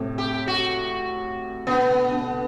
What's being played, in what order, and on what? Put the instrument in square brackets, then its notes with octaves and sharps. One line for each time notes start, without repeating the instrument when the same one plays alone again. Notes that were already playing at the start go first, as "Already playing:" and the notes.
Already playing: [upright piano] A2 C3
[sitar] G4
F#4
[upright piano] B2 D3 [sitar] B3
[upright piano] B2
B2 D3